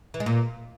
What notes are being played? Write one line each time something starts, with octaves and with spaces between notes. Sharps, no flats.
E3
G#3
A#2